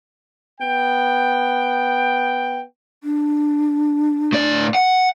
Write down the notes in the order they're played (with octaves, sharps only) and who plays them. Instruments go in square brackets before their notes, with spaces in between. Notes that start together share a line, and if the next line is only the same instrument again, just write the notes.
[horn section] B3 G5
[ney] D4
[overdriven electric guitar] A2 D5
F#5